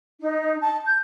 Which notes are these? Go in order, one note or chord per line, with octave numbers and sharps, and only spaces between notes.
D#4
A5
G6